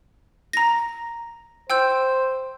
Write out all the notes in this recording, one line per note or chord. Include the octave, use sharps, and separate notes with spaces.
A#5 A#6
C5 G5 E6 G6